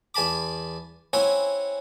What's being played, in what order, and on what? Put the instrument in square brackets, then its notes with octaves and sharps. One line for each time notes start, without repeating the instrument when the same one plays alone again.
[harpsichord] E2 G#5 A5 B5 D6
C4 C#4 E4 C#5 F#5 G#5